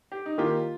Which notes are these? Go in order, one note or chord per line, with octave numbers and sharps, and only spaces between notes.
G4
D#4
D#3 A#3 F4 G4